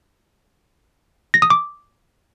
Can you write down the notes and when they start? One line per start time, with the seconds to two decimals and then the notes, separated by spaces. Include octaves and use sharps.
1.34 A#6
1.42 D#6
1.50 D6